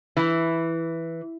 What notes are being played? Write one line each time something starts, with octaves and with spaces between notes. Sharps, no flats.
E3